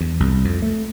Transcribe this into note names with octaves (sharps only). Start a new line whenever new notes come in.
E2
C2
F2
A3